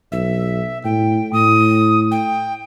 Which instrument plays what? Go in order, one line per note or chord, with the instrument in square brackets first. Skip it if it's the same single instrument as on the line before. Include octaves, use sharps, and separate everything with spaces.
[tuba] B1 [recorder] E5
[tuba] A2 [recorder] G5
[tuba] A2 [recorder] D#6
[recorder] G5